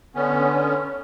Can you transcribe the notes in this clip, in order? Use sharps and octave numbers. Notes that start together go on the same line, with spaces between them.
D3 B3 C#4